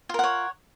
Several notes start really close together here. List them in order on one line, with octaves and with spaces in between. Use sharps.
F4 A#4 F#5 C#5